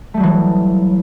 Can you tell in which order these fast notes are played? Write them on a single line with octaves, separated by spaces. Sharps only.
A3 G3 F#3 E3